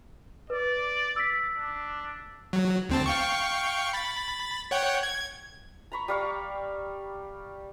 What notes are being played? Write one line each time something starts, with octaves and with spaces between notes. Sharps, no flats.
B4 D5
E6 B6
D4
F#3
D2 C4 A5
F5 G5 C#6
B5 A6
C#5 F#5 G5
G#6
A#5 B5 C#6
G3 F5 C#6